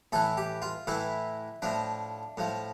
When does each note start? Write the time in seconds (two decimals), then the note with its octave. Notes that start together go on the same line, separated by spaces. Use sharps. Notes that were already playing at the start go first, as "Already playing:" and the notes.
0.12 A2 E3 A4
0.37 G4
0.62 F4
0.87 A2 E3 E4
1.62 A2 F3 D4
2.37 A2 F3